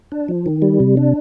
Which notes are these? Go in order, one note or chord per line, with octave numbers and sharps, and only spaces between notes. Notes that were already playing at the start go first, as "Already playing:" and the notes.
D4
F3
D#3
G3
C3
D4